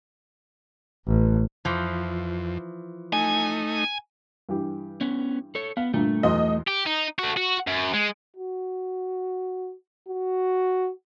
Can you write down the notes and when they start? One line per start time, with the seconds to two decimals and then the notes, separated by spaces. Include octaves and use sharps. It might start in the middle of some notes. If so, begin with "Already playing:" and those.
1.07 A1
1.65 F2 E3 F3
3.13 A3 D#4 G#5
4.49 G2 E3 G4
5.01 B3 C#4
5.55 A4 C#5
5.77 B3 F5
5.94 G2 A#2 D3 A3
6.23 B1 E2 D#5 C6
6.67 G4
6.86 D#4
7.19 A3 F#4
7.37 F#4
7.67 F#2
7.93 G#3
8.36 F#4
10.08 F#4